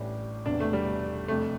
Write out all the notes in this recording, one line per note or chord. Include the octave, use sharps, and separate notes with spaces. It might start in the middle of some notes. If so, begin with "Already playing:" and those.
Already playing: A1 A2 G3 D4 G4
E1 E2 C3 D4
A3
G3
F2 C3 G3 A3 D4